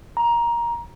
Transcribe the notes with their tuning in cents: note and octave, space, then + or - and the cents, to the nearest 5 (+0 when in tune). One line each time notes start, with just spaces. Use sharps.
A#5 +15